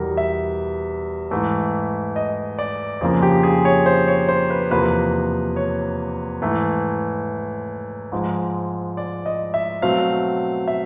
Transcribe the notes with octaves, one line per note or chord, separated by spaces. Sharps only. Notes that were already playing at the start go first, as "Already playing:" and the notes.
Already playing: E2 B2 G3 A#4
E5
G#2 E3 A3
D#5
D5
F2 C#3 F3 A#3 G#4
G4
G#4
C#5
C5
C#5
C5
B4
E2 C3 F3 A#3 B4
C#5
G#2 E3 A3
G#2 F3 G#3
D5
D#5
E5
B2 F#3 A3 C4 F5
E5